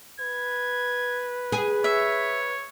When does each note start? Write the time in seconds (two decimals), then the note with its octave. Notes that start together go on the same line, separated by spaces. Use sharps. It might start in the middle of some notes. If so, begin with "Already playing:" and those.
0.20 B4 G#6
1.52 G#4
1.84 C#5 E5